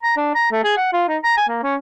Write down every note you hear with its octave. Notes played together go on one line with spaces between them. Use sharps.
A#5
D4
A#5
A3
G#4
F#5
F4
D#4
A#5
G#5
A#3
C#4